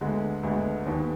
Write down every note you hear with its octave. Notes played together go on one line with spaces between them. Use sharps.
D2 D3 G#3 B3
D2 D3 G#3 B3
D#2 D#3 B3